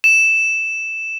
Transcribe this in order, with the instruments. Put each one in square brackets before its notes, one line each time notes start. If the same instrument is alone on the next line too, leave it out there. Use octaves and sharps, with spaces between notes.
[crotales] E7